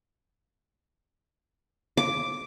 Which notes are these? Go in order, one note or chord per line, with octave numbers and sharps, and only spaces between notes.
D6